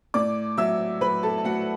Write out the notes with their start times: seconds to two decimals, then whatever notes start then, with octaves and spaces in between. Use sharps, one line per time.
0.14 A2 D5 D6
0.57 F#3 E5 E6
1.01 F#3 B4 B5
1.23 A4 A5
1.38 A5
1.45 A3 F#4 F#5